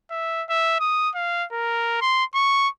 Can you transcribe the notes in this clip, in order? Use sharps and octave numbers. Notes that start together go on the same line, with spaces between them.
E5
E5
D#6
F5
A#4
C6
C#6